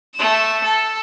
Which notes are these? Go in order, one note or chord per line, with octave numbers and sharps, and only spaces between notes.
A3 E7
A4